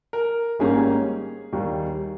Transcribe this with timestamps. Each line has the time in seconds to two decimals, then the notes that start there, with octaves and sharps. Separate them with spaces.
0.13 A#4
0.59 G#1 G#2 G3 A#3 C#4 G#4
1.52 D#2 D#3 G3